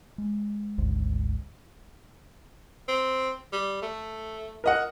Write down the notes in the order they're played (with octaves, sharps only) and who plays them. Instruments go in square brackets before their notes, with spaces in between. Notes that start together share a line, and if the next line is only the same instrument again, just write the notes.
[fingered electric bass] G#3
G#1 D2 G#2
[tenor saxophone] C4
G3
A3
[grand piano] A#4 D#5 F#5